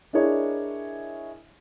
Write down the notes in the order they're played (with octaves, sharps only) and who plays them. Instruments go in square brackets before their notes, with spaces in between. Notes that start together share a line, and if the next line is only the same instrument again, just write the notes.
[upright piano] D4 E4 G#4 A#4 C#5 D#5